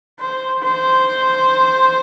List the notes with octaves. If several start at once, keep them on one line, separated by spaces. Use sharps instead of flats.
C5
C5